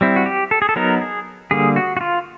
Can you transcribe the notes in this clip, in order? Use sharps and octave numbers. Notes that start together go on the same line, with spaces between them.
G3 C4 E4
F#4
G4
A4
G#4
A4
F#3 B3 D#4 A#4
G#4
D3 G3 A#3 G#4
F#4
F#4
F4